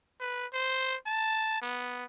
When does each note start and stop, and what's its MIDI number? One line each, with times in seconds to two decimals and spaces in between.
0.20 0.46 71
0.53 0.96 72
1.07 1.60 81
1.62 2.05 59